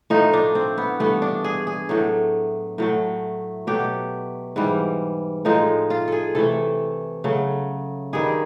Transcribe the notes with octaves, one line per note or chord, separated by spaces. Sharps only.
A2 F3 A3 D#4
D4
C4
B3
G2 E3 A3 B3
D4
G#4
G#4
A2 F#3 A3
A2 F#3 A3
B2 F#3 A3 G4
G#2 E3 G3
A2 F3 G#3 D#4
F4
G#4 A4
C3 E3 A3 A4
C#3 F#3 A3
G2 D#3 G3 G#4